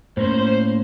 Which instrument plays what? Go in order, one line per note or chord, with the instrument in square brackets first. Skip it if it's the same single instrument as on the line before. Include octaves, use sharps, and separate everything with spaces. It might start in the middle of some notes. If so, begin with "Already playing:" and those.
[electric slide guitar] A2 A#3 C#4 [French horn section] C5